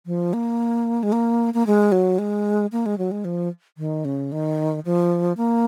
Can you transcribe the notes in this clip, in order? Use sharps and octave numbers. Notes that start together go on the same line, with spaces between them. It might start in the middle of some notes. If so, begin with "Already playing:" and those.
F3
A#3
G#3
A#3
A#3
G#3
F#3
G#3
A#3
G#3
F#3
G#3
F3
D#3
C#3
D#3
F3
A#3